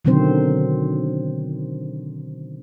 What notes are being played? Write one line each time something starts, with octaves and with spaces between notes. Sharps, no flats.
B2 D3 D#3 F#3 C4 C5